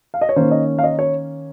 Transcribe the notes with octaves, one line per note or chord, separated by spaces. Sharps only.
F5
D#5
C#5
D#3 A#3 C#4 C5
D#5
F5
D#5
C#5